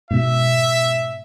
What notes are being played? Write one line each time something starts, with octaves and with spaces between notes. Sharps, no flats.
G#2 B2 E5